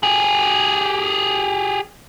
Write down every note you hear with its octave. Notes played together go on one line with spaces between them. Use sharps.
G4 G#4